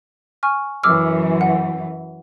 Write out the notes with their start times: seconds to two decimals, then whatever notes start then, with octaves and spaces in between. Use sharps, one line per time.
0.43 G#5 C#6 F6
0.84 F#2 E3 D6 E6 F6
1.41 F#5